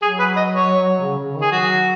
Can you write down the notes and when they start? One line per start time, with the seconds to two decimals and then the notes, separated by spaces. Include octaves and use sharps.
0.02 F#3 G#4
0.19 B4
0.36 D#5
0.52 C#5
1.01 C#3
1.18 C#3
1.35 D#3
1.41 G#4
1.51 F#3 F#4